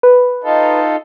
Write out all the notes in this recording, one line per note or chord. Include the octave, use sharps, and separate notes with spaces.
B4
D#4 F4 A4